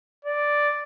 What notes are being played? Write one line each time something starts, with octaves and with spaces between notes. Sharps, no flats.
D5